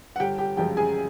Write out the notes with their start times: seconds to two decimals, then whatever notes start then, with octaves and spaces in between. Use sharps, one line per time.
0.16 F#5
0.20 G1 G4 G5
0.38 G4 G5
0.57 F#2 C#3 F3 G#3 G4 G5
0.77 G#4 G#5